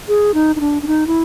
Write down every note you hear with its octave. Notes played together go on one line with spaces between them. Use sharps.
G#4
D#4
D#4
D4
D4
D#4
E4